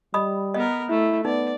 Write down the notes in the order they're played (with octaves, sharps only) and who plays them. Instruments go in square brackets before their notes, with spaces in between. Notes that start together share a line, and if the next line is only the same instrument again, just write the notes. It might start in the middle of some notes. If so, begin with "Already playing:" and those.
[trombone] G3 [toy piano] D#5 B5 D#6
[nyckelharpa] B3 A#4 [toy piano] D#5
[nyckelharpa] A3 [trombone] E4
[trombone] B3 [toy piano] D#4 [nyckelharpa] D5